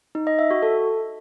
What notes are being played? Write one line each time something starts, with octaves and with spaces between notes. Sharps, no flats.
D#4
D#5
E5
F#4
A4